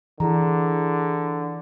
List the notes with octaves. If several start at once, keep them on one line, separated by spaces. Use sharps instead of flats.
D3 E3 E4 G#4 A#5